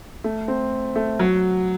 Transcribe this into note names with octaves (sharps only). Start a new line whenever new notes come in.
A3
C4
A3
F#3